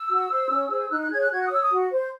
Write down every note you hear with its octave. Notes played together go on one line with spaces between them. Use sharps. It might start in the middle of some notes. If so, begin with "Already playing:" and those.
Already playing: E6
F#4
C5
C#4
G#4 C5
D#4 F#6
F#6
G#4 C#5 G#6
F#6
F#4 G#6
F#6
D#6
C#5 E6
D#6
F#4
C5